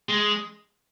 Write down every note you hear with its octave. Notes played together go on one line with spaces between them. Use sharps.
G#3